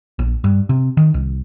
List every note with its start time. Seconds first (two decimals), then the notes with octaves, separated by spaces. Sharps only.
0.19 A#1
0.44 G2
0.69 C3
0.97 D#3
1.14 C2